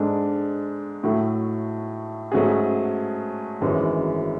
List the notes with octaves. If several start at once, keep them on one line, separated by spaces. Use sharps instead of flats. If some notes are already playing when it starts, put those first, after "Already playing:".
Already playing: G#2 G#3 D4 A4
A2 F#3 A3
G#2 F#3 A3 C#4 G#4
G#1 F#2 E3 G#3 C#4